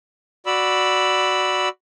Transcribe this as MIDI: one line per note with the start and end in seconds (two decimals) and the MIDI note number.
0.46 1.69 66
0.46 1.69 74
0.46 1.69 83
0.46 1.69 88